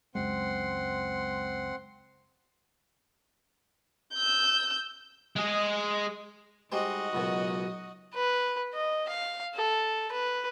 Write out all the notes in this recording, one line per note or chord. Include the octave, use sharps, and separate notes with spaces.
C#2 F#2 G#3 C4 F#5 C6
E6 G6
G#3 G#4
G3 G#3 D#4 F#4 C5 D#5
C#2 F#2 B2
B4
D#5
F5
A4
B4